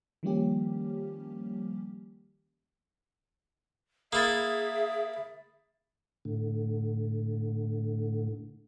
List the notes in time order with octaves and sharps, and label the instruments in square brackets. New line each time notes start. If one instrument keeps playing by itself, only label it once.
[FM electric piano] D#3 F3 G3 A#3 C#4 G4
[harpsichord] A#3 E4 [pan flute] G#4 [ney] E5 [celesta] D#6 A6
[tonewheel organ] A2 D3